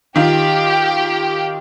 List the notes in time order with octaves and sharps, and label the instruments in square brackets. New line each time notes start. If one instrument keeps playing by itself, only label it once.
[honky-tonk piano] D#3 F4 [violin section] G4